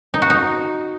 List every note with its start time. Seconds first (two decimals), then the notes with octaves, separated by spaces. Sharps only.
0.14 D#4
0.22 F#4
0.30 D#4